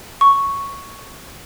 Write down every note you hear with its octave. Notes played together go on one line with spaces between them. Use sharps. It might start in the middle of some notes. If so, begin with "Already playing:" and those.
C#6